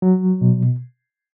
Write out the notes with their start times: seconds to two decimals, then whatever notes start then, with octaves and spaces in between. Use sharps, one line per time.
0.02 F#3
0.41 B2